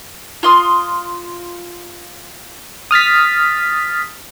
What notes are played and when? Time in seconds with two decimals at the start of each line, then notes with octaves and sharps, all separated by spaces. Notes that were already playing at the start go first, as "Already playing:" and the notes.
0.43 F4 C6 D#6
2.91 D#6 F6 A6 B6